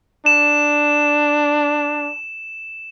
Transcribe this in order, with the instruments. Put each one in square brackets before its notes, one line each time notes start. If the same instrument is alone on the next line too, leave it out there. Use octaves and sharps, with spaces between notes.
[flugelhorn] D4 [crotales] E7